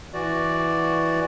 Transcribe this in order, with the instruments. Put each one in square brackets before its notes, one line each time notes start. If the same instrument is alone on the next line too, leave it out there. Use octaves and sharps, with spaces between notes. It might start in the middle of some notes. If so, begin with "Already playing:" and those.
[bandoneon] E3 F#4 D5